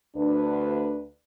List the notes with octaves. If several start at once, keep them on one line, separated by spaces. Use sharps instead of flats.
D2 D4 B4